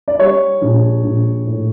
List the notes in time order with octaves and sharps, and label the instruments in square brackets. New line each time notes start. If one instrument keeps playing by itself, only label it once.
[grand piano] D5
G3 C#5
A#1
A#1
A2